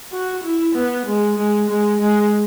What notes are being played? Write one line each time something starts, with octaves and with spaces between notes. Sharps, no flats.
F#4
E4
B3
G#3
G#3
G#3
G#3